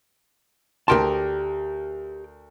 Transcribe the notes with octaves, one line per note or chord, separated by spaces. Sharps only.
D2 G4 A#4 G5 A5 C6